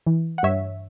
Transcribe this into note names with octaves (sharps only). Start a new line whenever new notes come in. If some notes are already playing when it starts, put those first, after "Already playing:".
E3
F#5
G2 C#5 E5